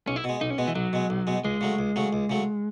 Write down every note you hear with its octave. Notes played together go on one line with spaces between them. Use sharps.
B1 C#4
E4
B2 G#3
B1 D#4
C#4
B2 G#3 B3
E3
B1 F#3
B2 G#3
B1
B2 G#3
C#2 G#3
C#3 F#3 A3
C#2
C#3 F#3 A3
C#2
C#3 F#3 A3